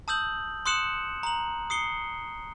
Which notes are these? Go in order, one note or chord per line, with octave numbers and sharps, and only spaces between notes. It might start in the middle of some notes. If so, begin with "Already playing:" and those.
A5 D#6 E6 G6 F#7
C6 D#6 F#6 C#7 E7 F#7
A#5 F#7
D#6 C7 C#7 G7